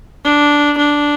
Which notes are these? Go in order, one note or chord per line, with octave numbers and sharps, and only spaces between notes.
D4
D4